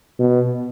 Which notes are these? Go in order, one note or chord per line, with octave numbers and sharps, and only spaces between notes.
B2